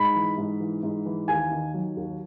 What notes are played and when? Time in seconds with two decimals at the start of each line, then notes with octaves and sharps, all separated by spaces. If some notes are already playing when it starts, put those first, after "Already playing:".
Already playing: G#2 B5
0.15 E3
0.38 G#2
0.60 E3
0.83 G#2
1.06 E3
1.28 D#2 G#5
1.51 D#3
1.74 F#3
1.97 D#2